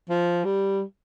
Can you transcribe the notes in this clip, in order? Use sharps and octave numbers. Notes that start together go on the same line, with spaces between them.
F3
G3